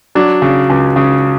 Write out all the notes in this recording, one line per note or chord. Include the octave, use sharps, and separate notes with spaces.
F#3 D4
C#3
C#2
C#3